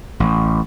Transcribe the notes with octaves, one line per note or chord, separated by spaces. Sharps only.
A1